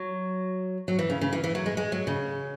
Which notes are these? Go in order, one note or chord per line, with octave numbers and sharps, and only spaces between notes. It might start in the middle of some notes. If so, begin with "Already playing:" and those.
Already playing: F#3
F#3
E3
C#3
C#3
E3
E3
F#3
G#3
G#3
F#3
C#3